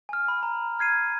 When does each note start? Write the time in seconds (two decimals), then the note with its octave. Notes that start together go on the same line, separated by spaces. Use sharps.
0.09 G#5 F6
0.28 B5
0.43 A#5
0.79 F6 G#6 C7 D#7